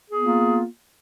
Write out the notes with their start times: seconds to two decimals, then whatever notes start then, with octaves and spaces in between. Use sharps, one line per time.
0.10 G#4
0.15 B3
0.19 F4
0.24 A#3